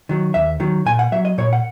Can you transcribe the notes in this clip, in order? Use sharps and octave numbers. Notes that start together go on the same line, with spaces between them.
D#3 F#3
D#2 E5
D#3 F#3
A#2 G#5
F#5
F#3 E5
D#5
A#2 C#5
F#5